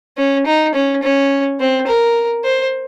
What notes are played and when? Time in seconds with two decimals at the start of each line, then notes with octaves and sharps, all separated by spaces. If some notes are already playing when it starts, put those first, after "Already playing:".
0.17 C#4
0.46 D#4
0.75 C#4
1.03 C#4
1.60 C4
1.87 A#4
2.44 C5